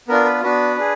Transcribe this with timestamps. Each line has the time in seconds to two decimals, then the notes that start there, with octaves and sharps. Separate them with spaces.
0.08 B3 D4 F4 A#4
0.25 B4
0.42 B3 D4 F#4 B4
0.76 D4 G#4